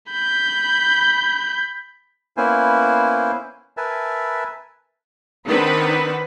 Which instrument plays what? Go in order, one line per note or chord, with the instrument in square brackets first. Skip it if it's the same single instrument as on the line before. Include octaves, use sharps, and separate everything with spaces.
[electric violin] B5 G6
[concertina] A#3 B3 C#4 E4 C5 G#5
A#4 B4 E5 G#5 A5
[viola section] D#3 C4 D4 B4 F#5 B5